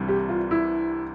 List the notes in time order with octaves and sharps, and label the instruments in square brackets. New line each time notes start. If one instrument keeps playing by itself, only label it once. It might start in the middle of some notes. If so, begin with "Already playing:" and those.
Already playing: [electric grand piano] C2 C3 E3 G3 D4
[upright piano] G4
F4
E4